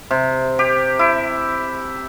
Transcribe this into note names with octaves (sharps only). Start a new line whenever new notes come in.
C3
G4
E4